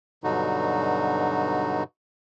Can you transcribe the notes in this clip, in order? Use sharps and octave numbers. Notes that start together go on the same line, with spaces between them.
G2 B2 D3 F#3 D#4 F#4